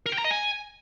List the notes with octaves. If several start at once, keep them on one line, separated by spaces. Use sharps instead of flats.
A#4
G5
A#5
D#5
G#5